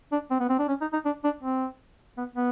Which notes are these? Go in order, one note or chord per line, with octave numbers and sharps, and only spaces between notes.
D4
C4
B3
C4
D4
C#4
D#4
D#4
D4
D4
C4
B3
B3